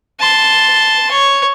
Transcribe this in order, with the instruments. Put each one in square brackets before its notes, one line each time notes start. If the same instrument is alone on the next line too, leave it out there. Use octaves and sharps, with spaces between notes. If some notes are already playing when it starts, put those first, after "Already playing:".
[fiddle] A5 C6
C#5